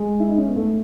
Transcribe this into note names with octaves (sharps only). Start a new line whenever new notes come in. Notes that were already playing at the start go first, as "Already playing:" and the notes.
Already playing: G#3
E4
D#4
C#4
B3
A3